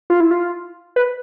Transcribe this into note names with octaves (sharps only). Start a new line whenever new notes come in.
F4
E4
F4
B4